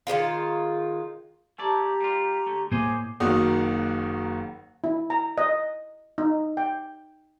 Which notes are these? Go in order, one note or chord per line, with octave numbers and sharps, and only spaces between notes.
D#3 E3 G#3 F4
A3 E4 G4 D5 A5 A#5
G3 F4
D3 A3
A2 A#3 G#4 C5 D#5 G#5 D6
F#1 D#3 A#3 F#4 D#6
E4
A#5
D#5
D#4
G5